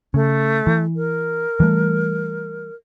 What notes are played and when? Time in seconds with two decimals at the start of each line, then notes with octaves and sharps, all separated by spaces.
0.14 C#3 A3
0.67 E3
0.96 A#4
1.60 E3 G3 A3